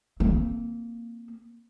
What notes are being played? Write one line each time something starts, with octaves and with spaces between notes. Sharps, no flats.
A#3 C4